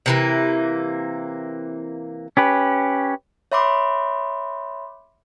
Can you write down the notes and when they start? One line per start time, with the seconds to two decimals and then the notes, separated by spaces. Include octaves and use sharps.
0.06 C3 E3 A#3
2.37 C#4 G4 B4
3.52 C#5 E5 B5 C6 D6